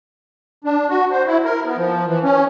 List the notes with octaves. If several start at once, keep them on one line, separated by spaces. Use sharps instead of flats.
D4
F#4
C5
E4
A#4
B3
F3
E3
C#4